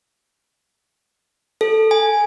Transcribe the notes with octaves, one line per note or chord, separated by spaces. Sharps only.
A4
G#5